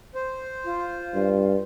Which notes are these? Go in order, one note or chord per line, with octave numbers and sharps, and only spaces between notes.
C5
F4
G2